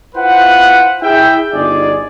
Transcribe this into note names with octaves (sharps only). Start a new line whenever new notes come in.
E4 F4 B4 C5 F#5
E4 G#4 E5 G5
G1 D#4 G#4 D5